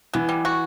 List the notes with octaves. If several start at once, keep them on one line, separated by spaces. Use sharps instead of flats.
E3 B3
G3
F#4